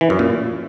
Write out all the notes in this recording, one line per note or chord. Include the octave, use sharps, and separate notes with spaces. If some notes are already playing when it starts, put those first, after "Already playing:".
E3
F#2
A#2